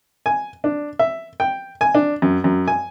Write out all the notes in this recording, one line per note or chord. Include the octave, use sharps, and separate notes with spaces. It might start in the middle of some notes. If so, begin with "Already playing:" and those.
G#5
D4
E5
G5
G#5
D4
F#2
F#2
G#5